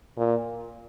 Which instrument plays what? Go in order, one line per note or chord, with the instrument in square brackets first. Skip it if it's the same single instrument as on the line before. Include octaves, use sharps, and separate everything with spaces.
[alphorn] A#2